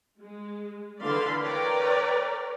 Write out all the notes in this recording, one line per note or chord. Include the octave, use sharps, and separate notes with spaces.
G#3
D3 E3 D5 F5 B5 C6
A#4 B4 C#5 D5 G5 A#5